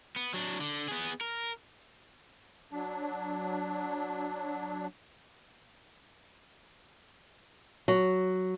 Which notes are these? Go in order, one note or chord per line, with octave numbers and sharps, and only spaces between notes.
B3
F#3 D4
D3
B3 G#4
A#4
F#3 D4
F#3